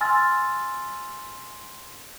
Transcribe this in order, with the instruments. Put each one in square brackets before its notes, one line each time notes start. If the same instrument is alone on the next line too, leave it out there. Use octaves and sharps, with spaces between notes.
[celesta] G#5 C6 E6 F6 A6